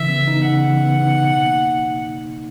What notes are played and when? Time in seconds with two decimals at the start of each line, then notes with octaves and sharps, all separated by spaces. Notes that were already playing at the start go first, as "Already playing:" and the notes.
Already playing: C#3 E3 E5
0.08 B3
0.28 D#4
0.47 C#3 F#5
0.66 E3
0.85 B3
1.05 D#4
1.24 B2
1.43 A#3